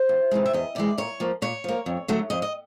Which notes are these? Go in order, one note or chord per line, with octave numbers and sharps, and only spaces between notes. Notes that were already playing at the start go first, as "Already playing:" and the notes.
Already playing: C5
E2
C3 E3 G#3
E5
E2 D#5
C3 E3 G#3 D5
A#2 C#5
F3 A#3
A#2 C#5
F3 A#3
F2
D3 F#3 A3
F2 D#5
D#5